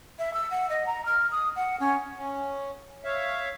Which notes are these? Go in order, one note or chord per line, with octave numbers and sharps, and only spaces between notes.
E5
E6
F#5
D#5
A#5
F6
D#6
F#5
C#4
C#4
C#5 E5 F5